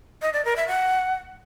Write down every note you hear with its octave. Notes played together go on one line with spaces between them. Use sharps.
D#5
D5
A#4
E5
F#5